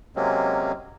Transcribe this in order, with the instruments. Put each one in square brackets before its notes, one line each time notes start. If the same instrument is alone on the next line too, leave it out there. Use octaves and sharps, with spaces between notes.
[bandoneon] C3 F#3 G#3 A#3 C4 C#4